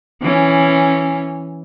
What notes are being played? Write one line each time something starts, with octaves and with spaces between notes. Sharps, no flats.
E3 C#4